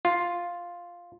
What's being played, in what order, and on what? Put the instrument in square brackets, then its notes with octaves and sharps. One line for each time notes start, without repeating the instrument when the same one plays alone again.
[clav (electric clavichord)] F4